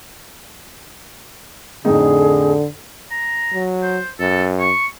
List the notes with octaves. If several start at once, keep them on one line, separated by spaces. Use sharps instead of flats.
F2 A2 D3 D#4 G#4
A#5
F#3
C5
F#2 A4
C#6